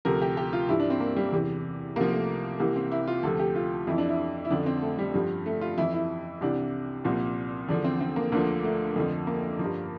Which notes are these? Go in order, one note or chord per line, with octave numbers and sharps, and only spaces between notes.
D2 C3 F3 A#4
G4
G4
F4
G2 E3 E4
D4
C4
A#3
G3
E2 C3 E3
C2 C3 F3 A#3
A3
C2 C3 E3 A#3
C4
E4
F4
D2 C3 F3 A4
G4
F4
F2 E3 E4
D4
E4
E4
F2 D3 F3 D4
C4
A3
G3
G2 F3
A3
F4
F2 E3 E4
E4
C2 C3 E3 D4
C2 A#2 F3
E2 D3 F3 D4
C4
C4
A#3
D2 D3 F3 A#3
A3
F2 D3 F3
A#3
F3
G2